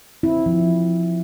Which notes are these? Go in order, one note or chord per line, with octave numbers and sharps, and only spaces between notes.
C4 E4
F3